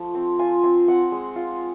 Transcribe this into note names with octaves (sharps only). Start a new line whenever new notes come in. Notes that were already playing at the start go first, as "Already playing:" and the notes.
Already playing: F3 A3 A5
C4
F4 G#5
C4 G#5
C4 F#5
G#3
F4